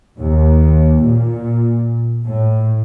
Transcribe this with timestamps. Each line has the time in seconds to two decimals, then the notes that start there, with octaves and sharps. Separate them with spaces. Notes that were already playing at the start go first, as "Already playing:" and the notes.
0.19 D#2
1.04 A#2
2.24 A2